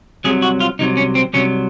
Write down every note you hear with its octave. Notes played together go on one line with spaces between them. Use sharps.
C2 C3 F#3 G#4
F#4
F4
C2 C3 F#3 D#4
C#4
C4
C2 C3 F#3 C#4